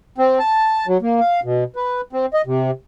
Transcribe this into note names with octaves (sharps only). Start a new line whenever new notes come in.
C4
A5
F#3
A#3
F5
B2
B4
C4
D#5
C3